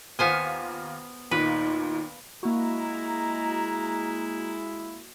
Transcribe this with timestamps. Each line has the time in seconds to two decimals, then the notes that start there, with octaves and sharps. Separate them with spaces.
0.19 D#2 B3 F4 C5 G#5 F6
1.31 D#2 A#2 D#4 B4
2.43 G#3 A#3 E4 F#4 A#5